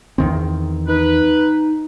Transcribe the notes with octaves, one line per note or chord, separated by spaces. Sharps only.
E2 D#3 C4
D#4 B4